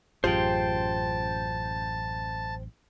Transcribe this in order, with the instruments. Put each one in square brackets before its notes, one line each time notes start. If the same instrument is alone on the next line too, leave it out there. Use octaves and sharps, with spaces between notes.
[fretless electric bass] A1 F#2 [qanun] F4 G4 G#4 [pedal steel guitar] C5 G5 [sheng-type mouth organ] A5